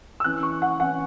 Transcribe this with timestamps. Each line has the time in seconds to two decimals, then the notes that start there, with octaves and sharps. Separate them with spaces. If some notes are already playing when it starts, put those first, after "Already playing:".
0.20 E6
0.24 E3 C#4 F#6
0.43 C#6
0.62 F#5
0.80 E3 C#4 F#5